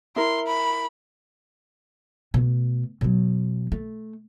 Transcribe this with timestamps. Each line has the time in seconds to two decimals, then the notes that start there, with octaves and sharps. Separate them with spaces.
0.16 E4 A#4 C6
0.47 B5
2.34 B2 A3
3.01 B2 F#3
3.72 A3